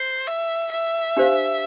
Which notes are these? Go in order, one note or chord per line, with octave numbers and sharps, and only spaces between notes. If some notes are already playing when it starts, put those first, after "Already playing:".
Already playing: C5
E5
E5
D4 G4 C5 F5